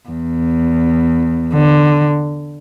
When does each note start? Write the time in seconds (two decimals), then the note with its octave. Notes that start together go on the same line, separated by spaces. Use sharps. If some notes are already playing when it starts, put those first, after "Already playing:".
0.09 E2
1.54 D3